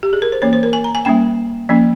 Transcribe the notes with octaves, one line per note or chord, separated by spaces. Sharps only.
G4
G#4
A#4
C5
E3 A#3 C#4 C#5
C5
A#4
G#5
A#5
G#5
G3 A#3 C#4 G5
F3 A#3 C#4